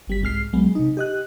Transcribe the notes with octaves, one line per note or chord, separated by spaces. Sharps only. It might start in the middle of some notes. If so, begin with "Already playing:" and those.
G1 G3 B6
C2 G#2 G#3 F6 C7
B1 F#3 G#3 B3
C3 D#4
G4 D#5 F#6